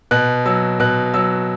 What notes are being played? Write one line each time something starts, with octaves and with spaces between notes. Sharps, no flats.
B2 F#6
F#3 E6
B2 F#6
F#3 E6